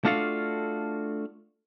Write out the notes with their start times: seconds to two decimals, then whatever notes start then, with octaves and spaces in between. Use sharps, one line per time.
0.05 A3 D4 F4 F#4 A4 F5